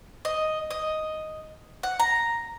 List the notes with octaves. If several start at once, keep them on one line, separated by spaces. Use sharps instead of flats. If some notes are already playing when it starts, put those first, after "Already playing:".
D#5
D#5
F#5
A#5